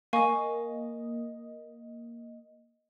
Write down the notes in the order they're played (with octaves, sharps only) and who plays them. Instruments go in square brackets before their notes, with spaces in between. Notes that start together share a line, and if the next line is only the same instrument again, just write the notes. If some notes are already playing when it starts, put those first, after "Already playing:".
[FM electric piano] A#3 D#5 [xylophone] F5 G#5 C#6